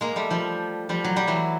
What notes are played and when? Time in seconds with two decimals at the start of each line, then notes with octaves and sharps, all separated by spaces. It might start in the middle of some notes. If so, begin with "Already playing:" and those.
0.01 G#3 A#3
0.16 G3 A3
0.31 F3 G3
0.89 F3 G3
1.04 F#3
1.16 G3
1.27 E3 F#3